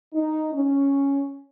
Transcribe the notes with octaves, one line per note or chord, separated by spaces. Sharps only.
D#4
C#4